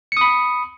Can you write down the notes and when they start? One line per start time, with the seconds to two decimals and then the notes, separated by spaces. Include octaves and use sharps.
0.12 C#7
0.17 D#6
0.21 B5